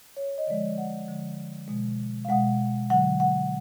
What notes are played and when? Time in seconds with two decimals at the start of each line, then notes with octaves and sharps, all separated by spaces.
0.17 C#5
0.38 D#5
0.47 D3 F3 G#3 D5
0.78 F#5
1.08 D3 F3 G#3
1.68 B2 G#3
2.25 F5
2.29 B2 G#3 F#5
2.90 D3 F#3 F#5
3.20 F#5